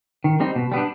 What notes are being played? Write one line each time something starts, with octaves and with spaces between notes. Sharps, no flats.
D#3
G3 C4 D#4
B2
G3 B3 D4